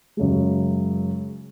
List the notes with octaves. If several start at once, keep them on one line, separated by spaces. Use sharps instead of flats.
F#2 C#3 G#3